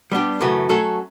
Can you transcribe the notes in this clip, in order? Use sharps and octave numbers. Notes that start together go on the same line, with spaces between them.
G3 B3 D4 G4
F#2 C#3 E3 A3
F#3 A3 C#4 F#4 A4